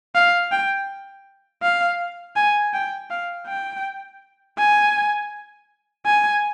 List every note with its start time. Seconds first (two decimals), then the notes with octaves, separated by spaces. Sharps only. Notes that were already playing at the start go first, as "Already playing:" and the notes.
0.15 F5
0.52 G5
1.63 F5
2.36 G#5
2.74 G5
3.11 F5
3.48 G5
4.58 G#5
6.06 G#5